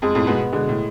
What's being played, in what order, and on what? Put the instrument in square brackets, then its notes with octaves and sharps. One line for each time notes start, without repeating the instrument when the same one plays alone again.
[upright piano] F2 [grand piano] G#3
[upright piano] F2 A2
[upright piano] G#2 B2 [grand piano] B3
[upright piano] B2 D3 [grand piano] G#3
[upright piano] A2